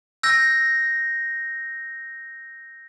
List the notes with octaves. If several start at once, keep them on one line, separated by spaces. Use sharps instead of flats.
E6 G6 A#6